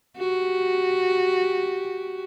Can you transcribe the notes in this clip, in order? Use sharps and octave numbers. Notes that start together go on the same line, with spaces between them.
F#4 G4